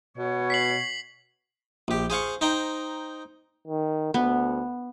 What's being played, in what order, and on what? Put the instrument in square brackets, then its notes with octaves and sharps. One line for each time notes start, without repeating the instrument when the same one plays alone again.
[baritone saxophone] B2 [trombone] B3 [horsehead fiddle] C#5
[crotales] B6 C7 F#7
[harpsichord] A#1 G4
G#4 C5 F5 C#6
D#4 C5 G5 A#5
[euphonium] D#3
[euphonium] D2 [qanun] B3